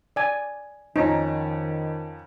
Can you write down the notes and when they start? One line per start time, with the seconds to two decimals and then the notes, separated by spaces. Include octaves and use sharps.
0.16 D5 G#5
0.96 F2 D#3 C#4 D#4 A#5